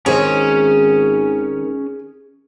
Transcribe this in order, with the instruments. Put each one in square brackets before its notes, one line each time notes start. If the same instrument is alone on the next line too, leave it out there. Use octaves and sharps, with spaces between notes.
[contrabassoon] G#1 [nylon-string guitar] D#3 C4 C#5 [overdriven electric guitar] C#4 G#5 [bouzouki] G#4